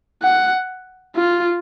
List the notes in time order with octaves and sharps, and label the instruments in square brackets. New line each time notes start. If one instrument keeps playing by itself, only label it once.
[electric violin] F#5
F4